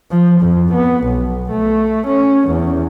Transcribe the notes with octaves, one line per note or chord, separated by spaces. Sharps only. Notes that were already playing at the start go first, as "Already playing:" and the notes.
F3
F2
B3
B1
A3
C#4
E2